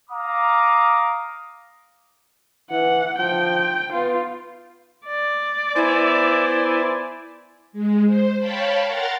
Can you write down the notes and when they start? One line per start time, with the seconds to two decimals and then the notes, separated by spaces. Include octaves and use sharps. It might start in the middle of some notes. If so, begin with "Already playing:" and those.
0.10 F5 A#5 D6 D#6
2.71 E3 F#5
3.19 F3 G5
3.94 B3 F4
5.06 D5
5.76 B3 E4 C5 G#5
7.73 G#3
8.06 C5
8.38 C#5 F5 G5 A5 B5
8.86 A#4 F#5 A#5 C6 A6